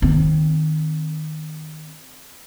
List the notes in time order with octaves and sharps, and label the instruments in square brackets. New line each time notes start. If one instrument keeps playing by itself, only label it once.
[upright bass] D#3 C4